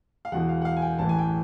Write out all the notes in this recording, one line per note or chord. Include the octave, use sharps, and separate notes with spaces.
F5
E1 E2 B2 F#5
F5
F#5
F5
G#5
G5
A1 A2 E3 A5
G#5
G5